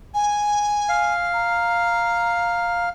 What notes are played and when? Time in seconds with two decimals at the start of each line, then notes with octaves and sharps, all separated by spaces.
0.14 G#5
0.89 F5
1.34 A#5